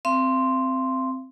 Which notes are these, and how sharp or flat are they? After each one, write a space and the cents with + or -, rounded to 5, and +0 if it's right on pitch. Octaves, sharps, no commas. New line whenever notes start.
C4 -5 F5 -45 C6 +0